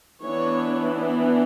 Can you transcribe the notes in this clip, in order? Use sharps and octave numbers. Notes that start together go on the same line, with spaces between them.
E3 B3 D4 C#5